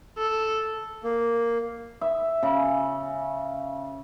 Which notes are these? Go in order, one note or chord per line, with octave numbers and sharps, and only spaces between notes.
A4
A#3
E5
C#3